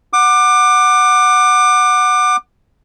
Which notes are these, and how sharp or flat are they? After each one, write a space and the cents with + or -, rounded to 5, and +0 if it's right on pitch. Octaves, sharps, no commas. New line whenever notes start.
F#5 +0 D6 +25